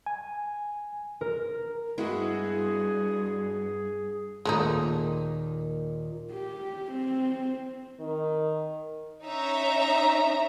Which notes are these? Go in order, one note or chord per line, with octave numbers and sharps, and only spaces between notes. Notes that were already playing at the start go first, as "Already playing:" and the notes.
G#5
A#4
G2 G#3 B3 E4 F#4 G#4
G#4
D#2 A#2 D#3 G#3 A3 D#4
G4
C4
D#3
C#4 D#4 E5 A#5